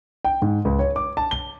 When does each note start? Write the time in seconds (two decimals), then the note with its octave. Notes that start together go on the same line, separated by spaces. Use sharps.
0.25 G5
0.42 G#2
0.65 C#2
0.79 C#5
0.96 D6
1.17 A5
1.31 G7